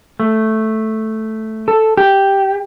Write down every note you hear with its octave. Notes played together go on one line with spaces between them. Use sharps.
A3
A4
G4